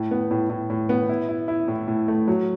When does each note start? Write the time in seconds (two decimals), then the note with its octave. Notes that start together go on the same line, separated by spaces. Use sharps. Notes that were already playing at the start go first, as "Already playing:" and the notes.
Already playing: A2
0.11 B3
0.31 A2
0.50 A2
0.70 A2
0.89 B3
1.09 E4
1.29 E4
1.48 E4
1.68 A2
1.88 A2
2.08 A3
2.28 F#3